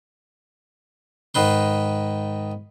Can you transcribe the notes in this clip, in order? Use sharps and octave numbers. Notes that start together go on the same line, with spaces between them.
G#2 D#3 B4 C6